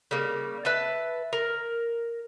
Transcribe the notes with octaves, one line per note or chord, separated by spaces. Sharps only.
C#3 G3 A#3
B4 E5 A5
A#4